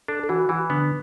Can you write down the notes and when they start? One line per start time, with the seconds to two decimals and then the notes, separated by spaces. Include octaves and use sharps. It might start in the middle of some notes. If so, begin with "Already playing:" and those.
0.08 D4 A4
0.23 A4
0.29 E3 F#4
0.49 E3
0.70 D3 B3